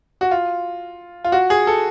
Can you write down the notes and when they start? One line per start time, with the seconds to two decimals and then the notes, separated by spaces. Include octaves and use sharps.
0.21 F#4
0.31 F4
1.24 F4
1.32 F#4
1.50 G#4
1.67 A4